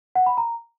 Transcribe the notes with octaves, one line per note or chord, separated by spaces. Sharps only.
F#5
B5
A#5